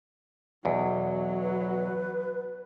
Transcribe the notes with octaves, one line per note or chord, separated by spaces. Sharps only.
B1 E2 F#3
B4